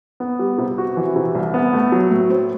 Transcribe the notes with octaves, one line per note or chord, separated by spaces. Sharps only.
B3
G3
C3
F#4
E3
C3
C2
B3
A3
F#3
A2
C4